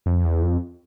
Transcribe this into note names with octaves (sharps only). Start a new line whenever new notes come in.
F2
E2
F2